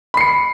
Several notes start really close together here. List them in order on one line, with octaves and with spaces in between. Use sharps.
B5 C7 C#7